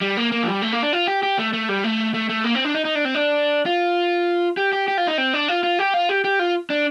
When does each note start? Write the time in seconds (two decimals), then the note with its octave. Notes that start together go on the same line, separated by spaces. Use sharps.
0.01 G3
0.17 A#3
0.32 A#3
0.43 F3
0.47 G3
0.62 A3
0.72 A#3
0.83 D4
0.93 F4
1.07 G4
1.23 G4
1.39 A3
1.53 A3
1.69 G3
1.84 A3
2.14 A3
2.29 A3
2.44 A#3
2.55 C4
2.65 D4
2.75 D#4
2.85 D#4
2.95 D4
3.05 C4
3.15 D4
3.66 F4
4.57 G4
4.73 G4
4.88 G4
4.98 F4
5.07 D#4
5.18 C4
5.34 D4
5.48 F4
5.63 F4
5.79 G4
5.94 F4
6.09 G4
6.24 G4
6.39 F4
6.70 D4